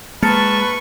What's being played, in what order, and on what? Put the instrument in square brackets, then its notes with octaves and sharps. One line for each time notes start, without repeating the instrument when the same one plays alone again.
[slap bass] G#3 [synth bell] A#3 A6 C#7 [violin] B4 C#6 [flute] A5